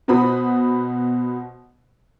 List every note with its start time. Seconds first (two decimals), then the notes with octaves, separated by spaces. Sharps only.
0.08 B2 F#4 C5 B5 D#6